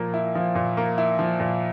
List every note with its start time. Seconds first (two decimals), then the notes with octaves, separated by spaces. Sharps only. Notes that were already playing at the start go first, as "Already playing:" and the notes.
Already playing: A#2 F3 A#3
0.14 E4
0.35 F3
0.55 A#2
0.77 A#3
0.98 E4
1.19 F3
1.40 A#2